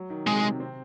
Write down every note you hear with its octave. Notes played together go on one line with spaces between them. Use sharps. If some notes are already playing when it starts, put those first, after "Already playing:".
Already playing: F#3
D#3
C3 G#3
C3
C4